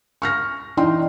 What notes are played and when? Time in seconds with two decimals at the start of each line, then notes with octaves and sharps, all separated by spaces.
0.22 C#6 F6 A#6
0.77 E3 D4 D#4 G5 C6